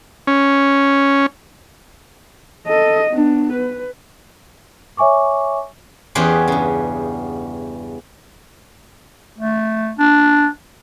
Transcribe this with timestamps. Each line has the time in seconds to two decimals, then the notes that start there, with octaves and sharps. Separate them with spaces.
0.27 C#4
2.67 A4 D#5
3.11 B3 D4
3.53 B4
4.97 C#5 E5 G#5 C#6 D6
6.15 E2 B3 C#4 G4 G#4 C5
6.48 G2 C#3
9.38 A3
9.99 D4